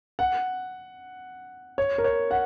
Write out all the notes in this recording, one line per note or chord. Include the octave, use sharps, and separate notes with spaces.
F#5
C#5
A#4
C#5
F#5